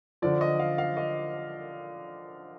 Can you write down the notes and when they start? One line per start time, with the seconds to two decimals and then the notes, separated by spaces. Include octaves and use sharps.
0.22 D3 F3 D5
0.41 D#5
0.59 F5
0.78 F5
0.97 D#5